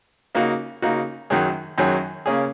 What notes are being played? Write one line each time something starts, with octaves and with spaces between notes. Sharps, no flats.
C#3 A#3 D#4 F#4
C#3 A#3 D#4 F#4
F#2 D#3 F#3 C#4 G#4
F#2 D#3 F#3 C#4 G#4
C#3 A#3 C#4 G#4